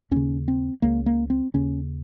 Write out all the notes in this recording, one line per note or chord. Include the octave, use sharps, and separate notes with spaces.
D#2 C#3 C#4
C4
C#2 C#3 A#3
A#3
C4
D#2 C#3 C#4